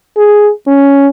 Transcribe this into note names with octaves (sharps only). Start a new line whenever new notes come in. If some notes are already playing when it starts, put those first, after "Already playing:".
G#4
C#4